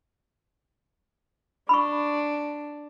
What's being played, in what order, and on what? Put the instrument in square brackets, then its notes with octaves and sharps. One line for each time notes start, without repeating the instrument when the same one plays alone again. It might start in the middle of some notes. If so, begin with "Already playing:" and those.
[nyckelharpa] D4 [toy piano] B5 C#6